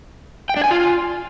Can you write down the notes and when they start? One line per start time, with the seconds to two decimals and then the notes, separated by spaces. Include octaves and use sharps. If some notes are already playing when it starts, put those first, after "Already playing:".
0.49 G5
0.57 D4
0.64 G#5
0.71 F4